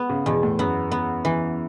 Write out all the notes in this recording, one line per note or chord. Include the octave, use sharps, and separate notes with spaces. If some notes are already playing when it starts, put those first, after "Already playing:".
Already playing: B3
C#3
E2 B2
A2
F#2 B3
B3
E3